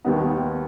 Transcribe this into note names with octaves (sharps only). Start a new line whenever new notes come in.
D#2 D#3 G3 B3 D#4